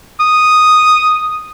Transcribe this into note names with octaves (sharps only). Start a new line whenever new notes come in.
D#6